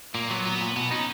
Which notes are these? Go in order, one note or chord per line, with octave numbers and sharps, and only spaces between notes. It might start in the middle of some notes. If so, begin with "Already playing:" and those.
A#2 A#3
F#3 B3
A#2 B3
A#2
B2 B3
C#4 D#4